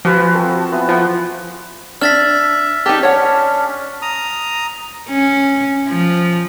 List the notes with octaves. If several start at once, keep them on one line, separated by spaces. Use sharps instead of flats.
F3 F#4 B4 G#5
C4 A4 C5
B3 E4 G#5
F3 F#5
D4 E5 F6 A6 B6
D#4 G4 D5 A5
C#4 D4 C#5 F#5
A#5 D#6
C#4
F3